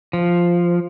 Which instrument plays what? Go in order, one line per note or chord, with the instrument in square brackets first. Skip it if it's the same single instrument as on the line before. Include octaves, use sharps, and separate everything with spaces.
[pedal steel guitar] F3